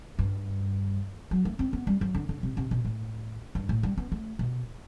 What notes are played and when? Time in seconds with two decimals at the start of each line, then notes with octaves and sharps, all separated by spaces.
0.19 G2
1.31 F#3
1.45 A3
1.59 C4
1.73 B3
1.87 G3
2.01 F#3
2.15 D3
2.29 D3
2.43 C3
2.57 C3
2.71 B2
2.85 A2
3.55 G2
3.69 A2
3.83 G3
3.97 B3
4.12 A3
4.39 B2